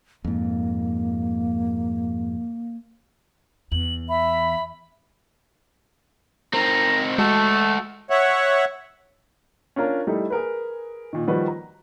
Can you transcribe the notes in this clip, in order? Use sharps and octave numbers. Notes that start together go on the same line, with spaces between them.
F2 G#2 A#3
E2 F#7
E5 B5
C4 D#4 A#4
G#3 A3 F#4 A4
C#5 E5 F#5
C#4 D4 F4 A#4
G3 A3 D#4 E4 G4
G#4 A#4 B4
A#2 D#3
D#3 F3 G3 F#4 B4 D#5
A#5